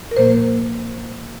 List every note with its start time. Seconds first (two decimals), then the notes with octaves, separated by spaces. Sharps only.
0.11 A#4
0.17 A#2 F3 A#3 C5